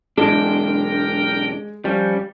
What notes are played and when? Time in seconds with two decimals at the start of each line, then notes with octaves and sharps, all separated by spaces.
0.18 B1 E2 G#3 D4 A#4 G5
1.85 F3 G3 C#4